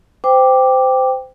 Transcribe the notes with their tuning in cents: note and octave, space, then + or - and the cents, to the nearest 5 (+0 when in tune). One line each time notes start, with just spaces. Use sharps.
C5 -25 G5 +5 D6 +0